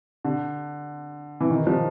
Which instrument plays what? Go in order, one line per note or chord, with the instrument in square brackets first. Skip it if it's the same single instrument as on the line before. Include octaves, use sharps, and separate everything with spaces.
[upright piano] D3
E3
D#3
F3